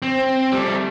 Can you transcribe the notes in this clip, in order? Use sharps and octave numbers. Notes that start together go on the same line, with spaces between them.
C4
G3 A3